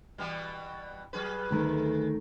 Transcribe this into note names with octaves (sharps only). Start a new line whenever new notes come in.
B2 E3 G3
F#3 G#4 B4
D2 D#3 A3